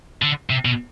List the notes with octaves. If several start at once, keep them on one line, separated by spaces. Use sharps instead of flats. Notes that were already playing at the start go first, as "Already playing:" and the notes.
D3
C3
B2